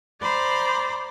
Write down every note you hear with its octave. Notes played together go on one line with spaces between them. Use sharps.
C5 D5 A#5 B5